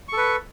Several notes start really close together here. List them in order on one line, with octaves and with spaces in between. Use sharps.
C#6 A4 B4